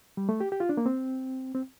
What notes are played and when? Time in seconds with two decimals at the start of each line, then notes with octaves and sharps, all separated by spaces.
0.17 G3
0.29 A3
0.40 G4
0.52 G4
0.60 F4
0.69 D4
0.77 A#3
0.86 C4
1.55 C4